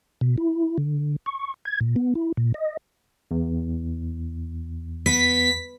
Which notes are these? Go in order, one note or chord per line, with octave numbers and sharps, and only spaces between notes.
B2
E4
D3
C#6
G#6
A#2
B3
E4
A#2
D#5
E2
B3 B6